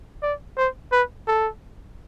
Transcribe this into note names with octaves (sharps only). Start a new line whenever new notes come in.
D5
C5
B4
A4